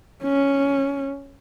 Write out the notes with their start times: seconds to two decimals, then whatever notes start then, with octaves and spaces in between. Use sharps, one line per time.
0.23 C#4